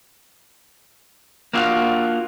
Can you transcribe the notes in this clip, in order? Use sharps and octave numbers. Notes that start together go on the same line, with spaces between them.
A#3 D4 F4 F#4